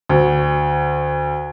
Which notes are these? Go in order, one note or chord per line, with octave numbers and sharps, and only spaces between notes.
D2